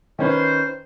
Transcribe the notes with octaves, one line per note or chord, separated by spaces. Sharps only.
D#3 C#4 B4 C5